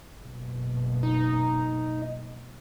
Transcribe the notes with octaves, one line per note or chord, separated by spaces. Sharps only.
F#1 B2
D#4